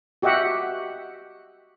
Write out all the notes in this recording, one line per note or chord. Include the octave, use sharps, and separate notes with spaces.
F#4 G4 D#5 E5 F#5